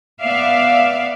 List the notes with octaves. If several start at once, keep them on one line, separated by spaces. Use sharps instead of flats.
B3 D5 E5 F5